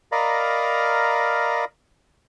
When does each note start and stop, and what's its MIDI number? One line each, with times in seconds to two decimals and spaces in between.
0.12 1.65 70
0.12 1.65 74
0.12 1.65 75
0.12 1.65 77
0.12 1.65 82
0.12 1.65 83